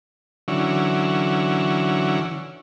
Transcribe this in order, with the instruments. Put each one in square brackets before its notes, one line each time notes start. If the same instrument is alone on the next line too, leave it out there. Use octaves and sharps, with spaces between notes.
[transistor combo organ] D3 E3 F#3 C#4